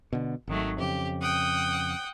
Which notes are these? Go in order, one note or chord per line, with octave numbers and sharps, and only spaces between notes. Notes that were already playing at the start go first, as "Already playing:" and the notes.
B2 D3
G#1 D#3 F#3 A3
F2 C#3 G4
F#5 G5 D#6